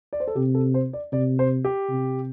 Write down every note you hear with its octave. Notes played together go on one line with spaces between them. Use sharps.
D5
C5
A4
C3 G4
A4
C5
D5
C3 D5
C5
G4
C3